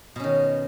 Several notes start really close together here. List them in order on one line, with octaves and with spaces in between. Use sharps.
B2 C#4 D#3